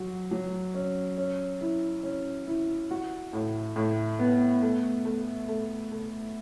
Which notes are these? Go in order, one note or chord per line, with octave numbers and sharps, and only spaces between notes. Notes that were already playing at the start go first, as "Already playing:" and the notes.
Already playing: F#3 F#4
F#3
C#4
C#4
E4
C#4
E4
F#4
A2
A2
B3
A3
A3
A3
A3